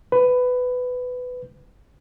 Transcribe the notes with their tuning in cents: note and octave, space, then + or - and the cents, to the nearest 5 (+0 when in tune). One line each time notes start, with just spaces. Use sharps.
B4 +15